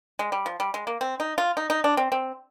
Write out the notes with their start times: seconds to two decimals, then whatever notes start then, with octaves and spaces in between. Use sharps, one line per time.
0.19 G#3
0.32 G3
0.46 F3
0.60 G3
0.74 G#3
0.87 A#3
1.01 C4
1.20 D#4
1.38 F4
1.57 D#4
1.70 D#4
1.84 D4
1.97 C4
2.12 C4